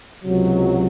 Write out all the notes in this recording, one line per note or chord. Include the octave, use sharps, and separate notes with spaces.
C#2 C3 F#3